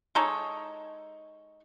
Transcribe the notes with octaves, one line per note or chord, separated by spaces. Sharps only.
G#3 D#4 A4 C#5